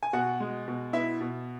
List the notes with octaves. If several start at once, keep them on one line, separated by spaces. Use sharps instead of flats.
G#5
B2 F#4 F#5
G#3
B2
B3 E4 E5
B2